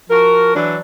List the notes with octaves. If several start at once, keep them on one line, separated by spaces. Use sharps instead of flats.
F3 F#4 A#4
E3 F#3 D4